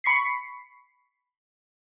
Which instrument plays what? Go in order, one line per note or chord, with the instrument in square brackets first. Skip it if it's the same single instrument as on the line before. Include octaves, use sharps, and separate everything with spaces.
[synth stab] B5 C#6 B6 C7